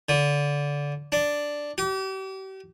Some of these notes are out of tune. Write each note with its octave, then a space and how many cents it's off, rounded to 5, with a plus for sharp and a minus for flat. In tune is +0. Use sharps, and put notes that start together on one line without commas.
D3 -20
D4 +0
G4 -40